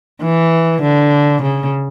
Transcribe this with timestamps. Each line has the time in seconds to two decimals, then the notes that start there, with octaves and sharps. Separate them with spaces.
0.22 E3
0.82 D3
1.42 C#3